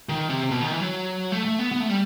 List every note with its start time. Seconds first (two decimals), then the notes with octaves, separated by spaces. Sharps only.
0.09 D#3
0.29 C3
0.51 B2
0.61 D#3
0.71 E3
0.80 F#3
1.32 A3
1.45 A3
1.59 B3
1.72 B3
1.80 A3
1.89 G3